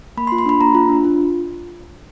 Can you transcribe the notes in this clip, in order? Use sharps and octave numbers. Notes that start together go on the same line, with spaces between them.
A#3 B5
C6
F4
C6
D4 B5
A#3 A#5
F4
D4
F4